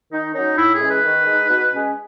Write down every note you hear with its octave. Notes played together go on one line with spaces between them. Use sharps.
D#3 D#4
F#3 C#4 D#4
A2 E4
G#4
E3 G#3 C#4
B4
D#3
G#3
D#4
B2
G#3 C#4